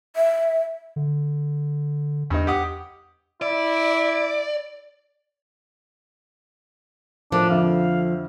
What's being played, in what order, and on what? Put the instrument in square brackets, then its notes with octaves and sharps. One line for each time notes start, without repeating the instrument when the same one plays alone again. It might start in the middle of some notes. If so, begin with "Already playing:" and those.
[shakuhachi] E5
[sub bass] D3
[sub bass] E2 [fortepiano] G2 D#4
[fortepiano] G4 F#5 D#6
[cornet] E4 [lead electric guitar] D5
[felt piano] A2 A#4 [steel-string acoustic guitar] F3 [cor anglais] D4
[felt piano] F2 D3 E5 [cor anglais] F5